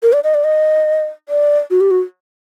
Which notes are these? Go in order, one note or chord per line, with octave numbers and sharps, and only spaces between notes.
A#4
D5
D#5
D5
D#5
D5
F#4
G4
F#4